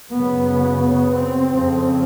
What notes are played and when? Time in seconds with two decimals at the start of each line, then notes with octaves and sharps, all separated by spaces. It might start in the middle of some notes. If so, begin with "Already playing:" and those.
0.12 F#2 C#3 B3
0.81 B3
1.15 C4
1.50 F2 C#3